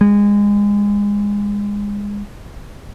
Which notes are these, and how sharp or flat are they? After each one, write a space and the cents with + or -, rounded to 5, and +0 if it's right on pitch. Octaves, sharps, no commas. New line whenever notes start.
G#3 -25